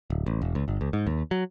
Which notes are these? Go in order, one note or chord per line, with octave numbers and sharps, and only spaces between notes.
D1
A1
E1
C#2
G1
C#2
G#2
D#2
F#3